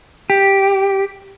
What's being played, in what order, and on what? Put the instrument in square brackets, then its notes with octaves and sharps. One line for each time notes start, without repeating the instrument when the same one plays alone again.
[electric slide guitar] G4